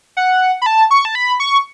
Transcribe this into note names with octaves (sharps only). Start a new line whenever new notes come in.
F#5
B5
A5
C#6
A5
B5
C#6